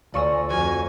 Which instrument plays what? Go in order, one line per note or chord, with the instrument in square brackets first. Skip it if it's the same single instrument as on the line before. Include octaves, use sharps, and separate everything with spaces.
[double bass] D2 [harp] F4 C#6 E6 [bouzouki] D5 G#5 A#5
[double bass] F2 [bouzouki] F#4 [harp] C#5 F6 [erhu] G#5